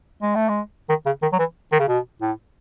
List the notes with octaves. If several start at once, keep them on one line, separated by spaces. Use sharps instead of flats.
G#3
A3
G#3
D#3
C#3
D#3
F#3
E3
D#3
C#3
B2
A2